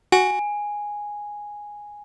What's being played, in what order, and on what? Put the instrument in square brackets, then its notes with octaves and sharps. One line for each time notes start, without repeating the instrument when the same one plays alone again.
[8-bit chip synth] F#4 [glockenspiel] G#5